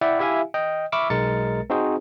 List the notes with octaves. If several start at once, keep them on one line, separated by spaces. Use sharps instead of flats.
E4 D5 E5 F#5 G5
E4 G4 E5 F5 G#5
D#5 G5
E5 B5 C#6 D6 E6 F6
B1 G#3 A#4 A6 C#7
C4 D#4 F#4 G#4 C5